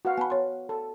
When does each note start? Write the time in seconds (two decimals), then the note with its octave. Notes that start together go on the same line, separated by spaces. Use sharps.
0.05 F#4 B4 F5
0.18 B3 G#5 A5 B5
0.30 C#5 C6
0.69 A4